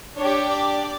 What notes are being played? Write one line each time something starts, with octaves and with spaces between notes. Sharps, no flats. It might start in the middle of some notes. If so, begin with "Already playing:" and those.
D4 G4 C#5
D5